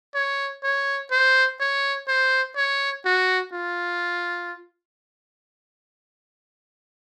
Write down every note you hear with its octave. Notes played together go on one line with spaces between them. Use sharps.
C#5
C#5
C5
C#5
C5
C#5
F#4
F4